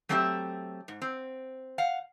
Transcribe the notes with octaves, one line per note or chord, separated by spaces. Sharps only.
F#3 A3 C4 G4 D#5 E5
G#2
C4
F5 F#5